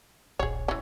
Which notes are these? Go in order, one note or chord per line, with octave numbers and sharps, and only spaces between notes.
D#1 A#1 G#4 C#5
E3 C#4